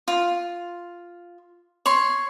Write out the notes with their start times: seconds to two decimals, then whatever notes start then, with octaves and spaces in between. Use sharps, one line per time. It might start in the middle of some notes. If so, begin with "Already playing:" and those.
0.08 F4
1.86 C#5 C6